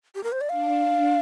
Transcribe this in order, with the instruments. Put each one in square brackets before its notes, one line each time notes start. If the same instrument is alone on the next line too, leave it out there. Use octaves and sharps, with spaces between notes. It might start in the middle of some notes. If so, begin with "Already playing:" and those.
[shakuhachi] G4
A#4
C5
D5
[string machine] D4 [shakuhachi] F5